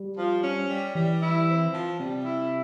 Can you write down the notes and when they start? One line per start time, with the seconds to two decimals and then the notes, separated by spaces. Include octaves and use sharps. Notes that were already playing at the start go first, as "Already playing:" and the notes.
Already playing: G3
0.17 F3
0.43 C#4
0.69 G3
0.95 E3 G3
1.22 E4
1.47 C4
1.73 F3
1.99 C3 G3
2.25 E4